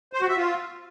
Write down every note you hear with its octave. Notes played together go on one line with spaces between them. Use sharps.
C5
F#4
E5
F4